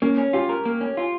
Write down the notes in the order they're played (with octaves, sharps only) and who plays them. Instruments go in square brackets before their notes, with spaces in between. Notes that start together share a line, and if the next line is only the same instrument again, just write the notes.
[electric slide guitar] A#3 [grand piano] C#4
[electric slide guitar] C#4
[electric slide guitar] F4 [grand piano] G4
[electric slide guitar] A#4
A#3
C#4
F4